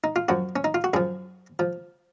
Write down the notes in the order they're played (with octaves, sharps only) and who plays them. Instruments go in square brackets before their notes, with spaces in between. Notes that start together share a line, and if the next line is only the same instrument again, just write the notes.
[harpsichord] D#4
F4
F#2 F3 F#4
C#4
D#4
F4
F#4
F#2 F3 G#4
F3